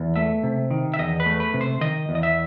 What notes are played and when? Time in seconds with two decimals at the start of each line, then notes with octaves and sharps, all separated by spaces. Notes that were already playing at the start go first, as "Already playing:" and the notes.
Already playing: E2
0.16 A3 E5
0.44 C3
0.71 D#3
0.94 E5
0.99 E2 D#5
1.20 B4
1.26 A3
1.40 B4
1.54 C3
1.61 C5
1.81 D#3 D#5
2.09 E2
2.15 D#5
2.23 E5